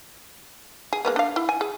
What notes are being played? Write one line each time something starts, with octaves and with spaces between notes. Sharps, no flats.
G#4
G#3 A#3 B3
D4 F5
E4
G#5
G#4